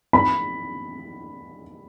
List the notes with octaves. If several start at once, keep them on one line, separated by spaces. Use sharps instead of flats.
B5